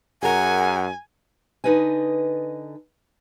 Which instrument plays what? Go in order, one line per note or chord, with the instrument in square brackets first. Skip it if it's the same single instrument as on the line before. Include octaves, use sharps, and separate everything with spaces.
[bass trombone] F#2 [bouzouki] G#4 A#4 [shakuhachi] F#5 [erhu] G#5
[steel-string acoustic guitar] D3 D#4 B4 D#5 G#5